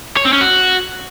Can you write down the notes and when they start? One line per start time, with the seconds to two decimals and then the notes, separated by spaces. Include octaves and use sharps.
0.17 C#5
0.25 C4
0.33 C#4
0.41 F#4